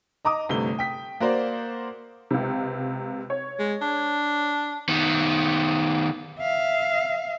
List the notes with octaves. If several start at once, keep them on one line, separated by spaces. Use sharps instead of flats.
D#5 A#5 D6 D#6
G1 C3 A3 G7
G5 B6
A#3 F#4 A#4 C5 D5
C#2 C3
C#5
G#3
D4
D#3 B3
E5 F5